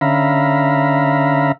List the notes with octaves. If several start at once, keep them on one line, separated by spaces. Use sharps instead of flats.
D3 C#4 E5 F5 A#5 B5